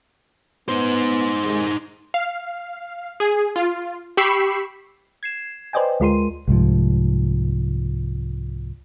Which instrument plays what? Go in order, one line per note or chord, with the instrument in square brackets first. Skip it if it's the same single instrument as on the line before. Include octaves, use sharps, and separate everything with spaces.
[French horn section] B3 [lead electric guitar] D#4 C5
[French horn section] C3 D#3 G#3
[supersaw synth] F5
G#4
F4
G4 B5 C#6 E6 C7
[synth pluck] G#6 C7 E7
B4 C5 D5 D#5 G5 G#5
D2 G#3 F4 A#4 C6 D#7
[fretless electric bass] C2 G#2 F3